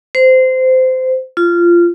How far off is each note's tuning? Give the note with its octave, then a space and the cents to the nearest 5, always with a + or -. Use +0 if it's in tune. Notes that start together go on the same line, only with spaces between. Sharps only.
C5 -20
F4 -15